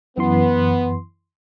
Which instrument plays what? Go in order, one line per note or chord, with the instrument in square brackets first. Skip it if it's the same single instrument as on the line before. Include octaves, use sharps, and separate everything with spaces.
[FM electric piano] F#2 E3 C6 [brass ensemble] B3